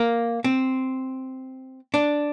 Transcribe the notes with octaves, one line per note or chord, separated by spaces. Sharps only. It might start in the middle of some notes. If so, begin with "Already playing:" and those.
Already playing: A#3
C4
D4